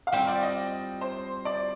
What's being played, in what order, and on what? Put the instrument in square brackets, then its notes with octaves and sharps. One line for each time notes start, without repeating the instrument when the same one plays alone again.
[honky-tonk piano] F5
[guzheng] G3 C4 F4 [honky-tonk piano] G5
[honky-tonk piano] D5
D#5
C5
D5